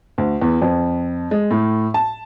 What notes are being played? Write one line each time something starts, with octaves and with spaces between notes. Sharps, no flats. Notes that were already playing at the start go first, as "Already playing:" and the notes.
D2
E2
F2
G#3
A2
A5